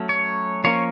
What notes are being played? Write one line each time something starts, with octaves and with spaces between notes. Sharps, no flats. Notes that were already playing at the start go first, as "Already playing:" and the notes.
Already playing: F#3 A3 C#4
C#5
F3 A#3 C#4 C#5